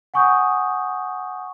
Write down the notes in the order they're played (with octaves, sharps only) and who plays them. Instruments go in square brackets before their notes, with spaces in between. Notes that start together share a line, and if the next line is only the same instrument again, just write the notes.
[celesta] F#5 G#5 C#6 D#6 G6